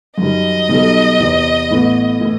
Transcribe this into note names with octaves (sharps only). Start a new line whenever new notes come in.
F#2 D#3 G3 D#5
B1 B2 G3 D#4 A4
E2 C3 E3
A1 A2 E3 B3
A2 E3 A3 E4